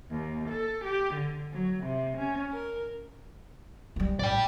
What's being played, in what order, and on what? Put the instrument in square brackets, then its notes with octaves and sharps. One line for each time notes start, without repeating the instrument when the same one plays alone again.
[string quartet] D#2
A4
G4
D3
F#3
C3
C#4
A#4
[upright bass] F#3 G3
[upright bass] A1 [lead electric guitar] D5 G5